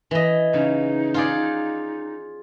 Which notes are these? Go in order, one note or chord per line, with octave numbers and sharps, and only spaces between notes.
E3 D#5
C#3 D#4
F4 G#4 D5